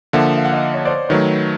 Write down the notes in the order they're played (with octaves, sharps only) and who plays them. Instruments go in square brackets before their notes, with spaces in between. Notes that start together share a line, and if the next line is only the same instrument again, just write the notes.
[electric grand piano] D3 F3 A#3 [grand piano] E5 F#5
[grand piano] F5
F#5
D#5 F5
C#5
C5 D5
[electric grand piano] D#3 F#3 A3 [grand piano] B4 C#5